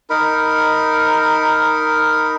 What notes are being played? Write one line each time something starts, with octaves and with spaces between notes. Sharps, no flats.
D#4 A#4 B5